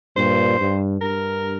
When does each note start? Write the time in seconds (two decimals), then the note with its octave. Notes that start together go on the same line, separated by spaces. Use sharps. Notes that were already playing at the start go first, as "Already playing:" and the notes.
0.16 G2 A#2 C5
0.59 G2
1.01 G2 A#4